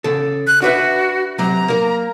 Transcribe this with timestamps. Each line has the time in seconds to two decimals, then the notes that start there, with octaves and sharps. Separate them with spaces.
0.04 C#3 A4
0.47 F#6
0.62 D4 F#4 B4 E5
1.39 C3 F#3 A#5
1.68 A#3 A#4